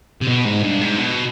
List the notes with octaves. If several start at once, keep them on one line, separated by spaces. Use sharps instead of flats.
C3
B2
G#2
G2
G#2
B2